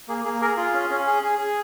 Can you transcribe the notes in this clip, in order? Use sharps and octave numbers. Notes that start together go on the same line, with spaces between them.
A#3 G#4
A#3 G#4
G#4 A#4
F4 G#4
C#4
C#4
G#4
G#4
G#4